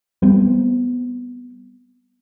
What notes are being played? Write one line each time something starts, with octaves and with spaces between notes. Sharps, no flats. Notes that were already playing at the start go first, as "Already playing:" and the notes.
G3 A3 B3 C4